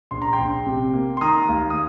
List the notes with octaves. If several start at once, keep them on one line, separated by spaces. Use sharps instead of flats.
A#1 C6
A#5
G5 C6
A#1
C3
A#3
C6
D#3 A#5 D#6
D#2
D#6